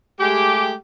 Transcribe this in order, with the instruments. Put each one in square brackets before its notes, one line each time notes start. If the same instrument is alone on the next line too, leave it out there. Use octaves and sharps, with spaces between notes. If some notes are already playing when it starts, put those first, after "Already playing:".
[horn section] G#3 A3 G4